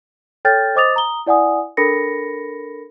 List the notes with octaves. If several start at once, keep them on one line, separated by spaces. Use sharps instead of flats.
A4 C#5 G5 F6 G6 A6
C5 D#5 D6 D#6 A6 F7
A#5 D#6 G7
E4 D5 F#5 G#5 D#6
D4 A4 A#4 B5 A#6 C#7